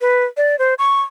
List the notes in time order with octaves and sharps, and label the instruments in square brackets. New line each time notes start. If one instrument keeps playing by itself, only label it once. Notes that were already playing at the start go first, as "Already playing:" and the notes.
[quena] B4
D5
C5
C#6